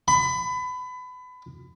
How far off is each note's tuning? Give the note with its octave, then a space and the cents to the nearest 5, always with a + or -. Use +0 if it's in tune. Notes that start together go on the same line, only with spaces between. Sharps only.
B5 +25